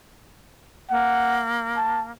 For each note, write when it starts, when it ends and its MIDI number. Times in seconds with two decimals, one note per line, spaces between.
0.90 2.11 58
0.90 1.42 78
1.77 2.02 81